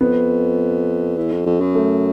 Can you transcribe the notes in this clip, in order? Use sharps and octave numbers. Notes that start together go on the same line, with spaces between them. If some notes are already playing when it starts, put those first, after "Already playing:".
F2 B3
E2
F2
F2
F#2
A3